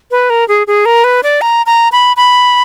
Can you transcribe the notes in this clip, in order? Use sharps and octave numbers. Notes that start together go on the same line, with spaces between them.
B4
A#4
G#4
G#4
A#4
B4
D5
A#5
A#5
B5
B5